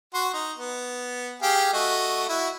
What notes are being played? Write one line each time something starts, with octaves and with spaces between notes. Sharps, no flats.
F#4 C6
D#4
B3
G4 G#4 F5
A3 F#4 D#5
E4 F#4